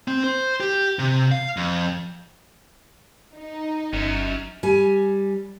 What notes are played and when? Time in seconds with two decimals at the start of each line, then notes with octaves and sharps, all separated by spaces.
0.08 C4
0.24 C5
0.60 G4
0.99 C3
1.32 F5
1.57 F2
3.35 D#4
3.93 G1 F#2
4.63 G3 G#5